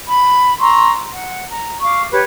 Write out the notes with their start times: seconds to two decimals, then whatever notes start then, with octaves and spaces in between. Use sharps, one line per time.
0.08 B5
0.59 A#5 C6 C#6 E6
1.12 F#5
1.49 A#5
1.81 F5 C#6 D6
2.11 G4 B4 C#5